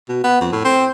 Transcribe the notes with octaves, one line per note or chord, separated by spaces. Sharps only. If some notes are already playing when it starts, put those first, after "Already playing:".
B2
B3
F2
A2
C4